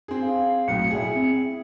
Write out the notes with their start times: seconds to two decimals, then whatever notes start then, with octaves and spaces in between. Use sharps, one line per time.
0.08 C4 G#4
0.22 F5
0.68 B1 A2 C#7
0.90 E4 G#4
1.15 C4